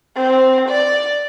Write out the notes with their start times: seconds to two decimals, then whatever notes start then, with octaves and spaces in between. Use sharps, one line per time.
0.16 C4
0.69 D5